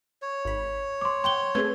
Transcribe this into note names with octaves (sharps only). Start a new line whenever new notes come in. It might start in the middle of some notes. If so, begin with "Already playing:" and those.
C#5
G#1 B5
C6 D6
F#5 G5 C6 C#6 G7
A3 C4 G#4 B4 G#6